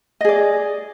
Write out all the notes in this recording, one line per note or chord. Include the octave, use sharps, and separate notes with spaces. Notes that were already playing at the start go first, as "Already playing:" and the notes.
G#4 D5 D#5